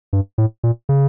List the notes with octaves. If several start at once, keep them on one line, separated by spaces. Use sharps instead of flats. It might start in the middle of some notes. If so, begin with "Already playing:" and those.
G2
A2
A#2
C#3